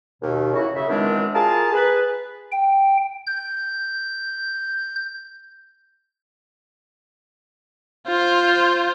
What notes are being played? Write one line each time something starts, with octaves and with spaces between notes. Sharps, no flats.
D#2 B2
F#2 C#3 E3 E4 F#4
F#2 C#3 E5
F#2 D#3 E3 G#3 C4 D4
F4 G#4 A#4 A5
G#4 B4
G5
G6
F4 C5